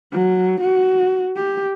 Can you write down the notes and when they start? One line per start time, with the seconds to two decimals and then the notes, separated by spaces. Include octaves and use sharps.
0.12 F#3
0.61 F#4
1.36 G4